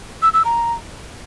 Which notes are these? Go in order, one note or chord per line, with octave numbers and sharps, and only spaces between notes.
E6
E6
A#5